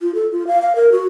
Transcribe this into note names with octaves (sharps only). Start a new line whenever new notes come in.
F4
A4
F4
F5
F5
A#4
F#4